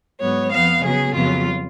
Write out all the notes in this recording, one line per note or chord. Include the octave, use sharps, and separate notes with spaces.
G#2 F#3 B3 C#5
F2 F3 B3 F5
C#3 F#3 B3 G#4
F2 C#3 F#3 B3 F4